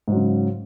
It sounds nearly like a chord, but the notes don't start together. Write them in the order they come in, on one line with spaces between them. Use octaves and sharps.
G#2 F#3 C#3